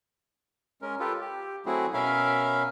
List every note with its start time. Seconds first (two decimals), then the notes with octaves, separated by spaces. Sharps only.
0.82 G#3 C#4 A#4
1.00 F4 G4 A4 B4
1.21 G4
1.66 F#3 A3 C4 E4 F#4 G#4
1.94 B2 C#4 A#4 E5 F5 B5